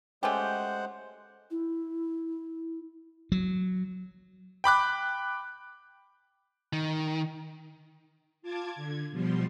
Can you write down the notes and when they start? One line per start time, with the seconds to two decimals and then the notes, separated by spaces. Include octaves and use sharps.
0.23 G#3 A3 C#4 G4 C5 F#5
1.51 E4
3.32 F#3
4.64 G5 B5 D6 F#6
6.73 D#3
8.42 F4 A5 D6 G#6
8.73 D3 G#6
9.11 B2 F3 G3 C6